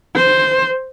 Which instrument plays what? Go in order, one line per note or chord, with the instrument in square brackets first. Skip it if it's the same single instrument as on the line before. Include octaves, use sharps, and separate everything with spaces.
[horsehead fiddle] C5